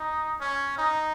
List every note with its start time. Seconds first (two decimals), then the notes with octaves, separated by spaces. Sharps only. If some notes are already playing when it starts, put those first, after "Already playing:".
Already playing: D#4
0.40 C#4
0.78 D#4